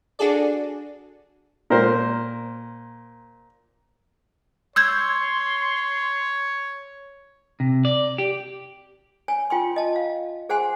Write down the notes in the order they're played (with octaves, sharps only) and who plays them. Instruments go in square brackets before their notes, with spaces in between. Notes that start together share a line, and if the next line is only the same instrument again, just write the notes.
[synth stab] D4 F#4 G#4 A4 D5
[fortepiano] A#2 A#4 C5
[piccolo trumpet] C#5 [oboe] C6 [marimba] E6 G6 G#6
[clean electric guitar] C3
D5
G4
[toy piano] C#5 G#5
F4 G5 C6
D#5 A5
F5
G#4 C5 F#5 G#5 C6